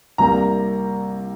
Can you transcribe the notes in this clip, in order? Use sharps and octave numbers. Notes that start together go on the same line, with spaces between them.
C2 C3 G3 A#3 A#5